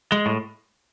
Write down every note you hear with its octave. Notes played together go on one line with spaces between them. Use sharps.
G#3
A2